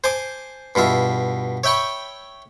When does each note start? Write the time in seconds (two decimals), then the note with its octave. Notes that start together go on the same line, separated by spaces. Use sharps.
0.04 C5 G#5 A5 D6
0.75 G2 B2 F4 E5
1.64 C#5 E5 G5 B5 C#6